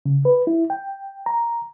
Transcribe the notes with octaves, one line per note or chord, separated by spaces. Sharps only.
C#3
B4
E4
G5
A#5